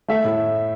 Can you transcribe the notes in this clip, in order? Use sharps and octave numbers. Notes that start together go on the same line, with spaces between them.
A3 E5
A2